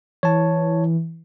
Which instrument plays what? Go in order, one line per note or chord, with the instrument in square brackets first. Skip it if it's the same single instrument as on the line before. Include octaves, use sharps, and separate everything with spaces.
[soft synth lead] E3 [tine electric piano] C#5 A5